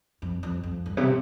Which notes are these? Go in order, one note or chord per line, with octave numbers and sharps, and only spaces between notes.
F2
F2
F2
G2
C3